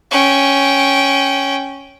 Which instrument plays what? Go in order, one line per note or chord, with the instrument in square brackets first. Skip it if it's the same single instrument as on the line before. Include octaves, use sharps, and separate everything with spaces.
[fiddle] C#4 G5